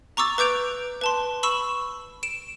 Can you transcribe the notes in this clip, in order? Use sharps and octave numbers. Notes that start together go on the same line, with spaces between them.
A#5 C#6 D6 E6 A6
B4 D6 G6 D7 F7
B4 A5 C6
B5 C#6 E6 E7
D7 E7